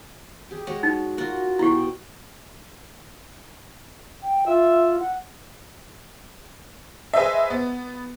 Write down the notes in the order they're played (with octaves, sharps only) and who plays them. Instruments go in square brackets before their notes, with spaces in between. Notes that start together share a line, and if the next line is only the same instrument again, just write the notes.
[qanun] G4 G#4
G#3 F#4 C#5
[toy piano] D#4
[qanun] F4 F#4 A#4
[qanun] B2 G5 [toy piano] E4 G4
[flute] G5
[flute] F4 [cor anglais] E5
[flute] F#5
[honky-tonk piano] G#4 B4 C5 D#5 E5
B3